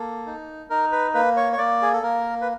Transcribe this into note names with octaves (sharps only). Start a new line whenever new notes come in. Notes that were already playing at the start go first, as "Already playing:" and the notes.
Already playing: A#3 A4
D#4
D#4 A#4
B4
A#3 B4
C#5
C#5
A#3 D5
G#4
A4
A#3 A#4
B4